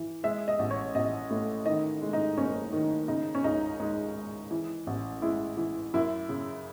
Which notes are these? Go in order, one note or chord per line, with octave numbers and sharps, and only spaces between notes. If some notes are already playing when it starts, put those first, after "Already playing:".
Already playing: E3
G#3 E5
D#5
A1
C#5
A1 D#5
A2
D#3 D#5
G#3
D#4
F#1 C#4
D#3
C#3 D#4
C#4
C#2 D#4
G#3 D#4
G#3
E3
A1
G#3 E4
E3
F#2 E4
C#3